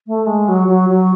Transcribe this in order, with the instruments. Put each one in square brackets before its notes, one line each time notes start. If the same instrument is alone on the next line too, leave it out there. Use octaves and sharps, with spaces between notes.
[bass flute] A3
G#3
F#3
F#3
F#3